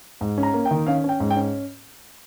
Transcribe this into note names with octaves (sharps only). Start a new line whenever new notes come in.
G#2
C#4
A#5
A#3
G5
D#3
C#4 F5
C#4 G5
G#2
G5
C#4